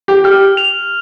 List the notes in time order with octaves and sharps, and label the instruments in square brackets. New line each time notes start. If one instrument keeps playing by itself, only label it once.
[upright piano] G4
[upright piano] G4 [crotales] F6
[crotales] F7